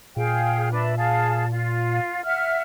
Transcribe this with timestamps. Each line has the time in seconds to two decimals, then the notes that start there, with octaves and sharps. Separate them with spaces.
0.16 A#2 G#4 F5 G5
0.72 D4 B4 E5
0.96 G#4 F5 A5
1.52 F4
2.24 E5 F#5 F6